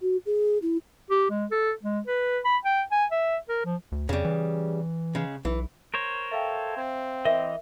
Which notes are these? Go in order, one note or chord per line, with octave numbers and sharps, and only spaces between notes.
F#4
G#4
E4
G4
G#3
A4
G#3
B4
B5
G5
G#5
E5
A#4
F3
D2
F2 C#3 G3
E3
C#3 G#3
B1 E3
A#4 C5 C#5
A4 E5 F5 G5
C4
E3 A#4 D#5 E5